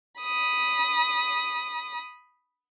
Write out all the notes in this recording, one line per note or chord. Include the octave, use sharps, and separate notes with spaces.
B5 D#6